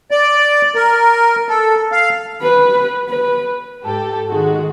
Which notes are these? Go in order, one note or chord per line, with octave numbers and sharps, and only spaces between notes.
D5
A#4
A4
F5
B4
B4
G#2 G4 A4
D#3 G#3 F#4